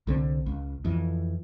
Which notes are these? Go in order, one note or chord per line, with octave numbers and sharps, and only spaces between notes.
C2 D3 C4
C#2
F2 E3